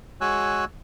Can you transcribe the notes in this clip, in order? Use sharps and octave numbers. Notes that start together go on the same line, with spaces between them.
G#3 F#4 C#5 G#5 E6 F#6